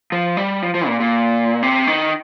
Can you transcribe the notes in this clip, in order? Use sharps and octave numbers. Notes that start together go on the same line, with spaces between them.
F3
G3
F3
F3
A#2
A#2
C3
D#3